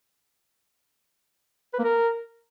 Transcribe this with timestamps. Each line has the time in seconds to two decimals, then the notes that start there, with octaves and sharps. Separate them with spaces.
1.74 B4
1.79 A#3
1.84 A#4